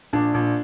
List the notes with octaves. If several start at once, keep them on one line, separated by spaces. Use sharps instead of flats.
A#1 D4
A#1